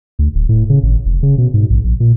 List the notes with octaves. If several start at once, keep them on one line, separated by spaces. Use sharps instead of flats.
D2
D1
A2
C#3
G#1
F1
C#3
B2
G#2
A#1
A#1
A#2